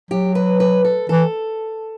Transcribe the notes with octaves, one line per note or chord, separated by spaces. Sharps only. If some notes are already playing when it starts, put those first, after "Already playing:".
F#3 G4
B4
B4
A4
E3 A4